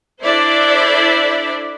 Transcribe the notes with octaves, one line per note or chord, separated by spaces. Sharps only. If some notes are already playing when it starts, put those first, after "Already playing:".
D4 E4 A4 C5 D5 E5